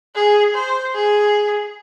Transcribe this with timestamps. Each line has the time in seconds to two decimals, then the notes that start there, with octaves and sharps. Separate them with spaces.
0.15 G#4
0.54 C5
0.94 G#4